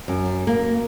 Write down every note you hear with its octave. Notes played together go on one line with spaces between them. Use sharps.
F#2
A#3